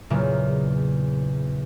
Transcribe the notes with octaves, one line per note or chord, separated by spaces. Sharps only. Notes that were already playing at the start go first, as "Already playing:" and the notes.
E2 A#2 C#3 F#3 A#3 C4